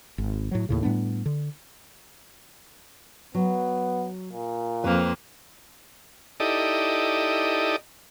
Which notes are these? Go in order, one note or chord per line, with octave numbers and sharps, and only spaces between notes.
G#1
A2 F#3
D#2 A2 C#3
A2 G3 B3 D4
D3
F#3 B3
A#2
F2 A#3 B4 C5 F5
D#4 E4 G4 A4 D5 D#5